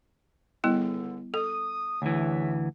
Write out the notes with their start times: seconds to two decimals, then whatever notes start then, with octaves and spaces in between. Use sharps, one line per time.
0.64 C#2 D3 G3 B3 E4
1.34 A4 D#6
2.02 D2 E3 G#4 C#5 E5